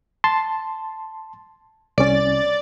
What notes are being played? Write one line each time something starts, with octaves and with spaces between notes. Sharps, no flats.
A5 C6
C2 C#4 D5